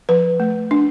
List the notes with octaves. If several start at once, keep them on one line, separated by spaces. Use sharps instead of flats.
F3 B4
A3
D4